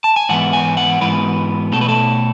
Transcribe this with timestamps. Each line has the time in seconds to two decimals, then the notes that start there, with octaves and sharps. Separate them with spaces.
0.04 A5
0.16 G#5
0.29 G#2 E3 B3 F#5
0.53 G#5
0.77 F#5
1.01 G#2 E3 B3 B4
1.73 B2 A3 A4
1.81 B4
1.89 A4